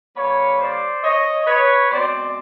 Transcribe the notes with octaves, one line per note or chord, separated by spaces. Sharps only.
D3 G3 A#3 B4 C#5
C5 D5
C#5 D#5
B4 C#5
B2 G#3 C4 C5 D5